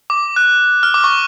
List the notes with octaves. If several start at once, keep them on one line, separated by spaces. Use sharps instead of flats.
D6
F#6
F6
D6
C#6